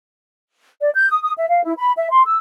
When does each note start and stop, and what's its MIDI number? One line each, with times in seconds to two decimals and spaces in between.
0.80 0.90 74
0.94 1.07 91
1.10 1.21 87
1.22 1.32 87
1.37 1.49 76
1.49 1.63 77
1.63 1.72 64
1.78 1.92 83
1.96 2.08 76
2.10 2.23 84
2.25 2.38 88